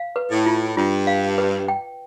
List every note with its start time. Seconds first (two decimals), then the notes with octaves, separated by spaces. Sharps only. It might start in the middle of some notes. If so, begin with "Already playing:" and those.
Already playing: F5
0.16 B4
0.31 A2
0.46 F4
0.76 G2 F4
1.07 F5
1.38 B4
1.68 G5